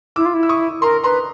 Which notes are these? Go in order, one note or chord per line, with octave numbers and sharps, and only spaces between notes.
E4 D6 E6
F4
E4
E6
C#6 D#6
A#4 A#5 C6
B4 A#5 C6